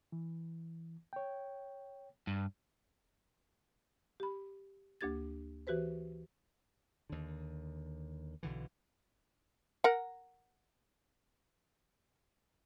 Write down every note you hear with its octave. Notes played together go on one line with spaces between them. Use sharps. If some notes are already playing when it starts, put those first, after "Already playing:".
E3
C#5 G5
G2
G4 B5
D2 A#3 D4 G4 G#6 A6
E3 F#4 G4 B4 C5
D#2 D3
B1 D3 E3
A#4 F#5